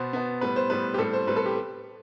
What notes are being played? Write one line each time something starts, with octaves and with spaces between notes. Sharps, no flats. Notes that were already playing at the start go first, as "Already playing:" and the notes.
Already playing: B2 B3 C5
B2 B3
A2 G3 B3 B4
C5
A2 G3 B3 B4
G4
A2 G3 C4 A4
C5
A2 G3 C4 B4
A4
G4